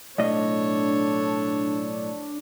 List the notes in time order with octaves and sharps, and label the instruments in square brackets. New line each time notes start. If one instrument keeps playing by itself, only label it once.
[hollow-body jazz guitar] B1 A2 D#5 [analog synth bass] D4 [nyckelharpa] A4 C#5